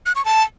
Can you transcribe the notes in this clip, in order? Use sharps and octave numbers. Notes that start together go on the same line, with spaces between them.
F#6
C#6
A5